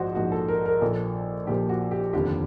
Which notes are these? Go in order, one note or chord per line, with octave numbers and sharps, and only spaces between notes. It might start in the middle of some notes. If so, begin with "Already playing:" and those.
Already playing: A#1 G#2 F3 F#4 C5
A#1 G#2 F3 F#4
A4
A#4
A#4
A#1 A#2 F3 A4
A#1 A#2 F3 G4
F#4
G4
F1 D#2 D3 F3 G4